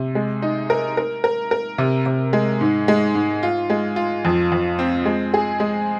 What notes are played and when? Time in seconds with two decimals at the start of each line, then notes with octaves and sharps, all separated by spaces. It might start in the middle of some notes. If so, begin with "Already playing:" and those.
Already playing: C3
0.15 G#3
0.42 D#4
0.70 A#4
0.97 A#4
1.24 A#4
1.51 A#4
1.78 C3
2.06 C3
2.33 G#3
2.61 G#2
2.88 G#3
3.15 G#2
3.43 F4
3.70 G#3
3.96 F4
4.25 F2
4.52 F2
4.79 C4
5.05 G#3
5.34 G#4
5.60 G#3